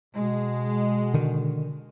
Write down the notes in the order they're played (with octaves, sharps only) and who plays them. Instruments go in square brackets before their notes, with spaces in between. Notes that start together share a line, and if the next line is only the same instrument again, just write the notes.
[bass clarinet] B2 [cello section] G#3
[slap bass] D3 D#3